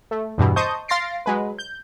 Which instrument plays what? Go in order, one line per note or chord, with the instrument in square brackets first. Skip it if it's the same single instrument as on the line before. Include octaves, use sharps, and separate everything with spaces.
[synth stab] A3
E2 G2 B2 E3
C5 D#5 A5 C#6 D#6 G6
F5 C6 A6 A#6 C7 D7
F#3 G#3 B4
G6